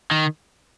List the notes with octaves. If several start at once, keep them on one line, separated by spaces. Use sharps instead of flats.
D#3